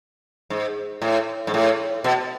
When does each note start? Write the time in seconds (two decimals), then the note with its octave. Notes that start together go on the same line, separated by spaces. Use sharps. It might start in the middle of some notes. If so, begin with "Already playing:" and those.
0.50 G#2
1.02 A2
1.47 G#2
1.54 A2
2.04 B2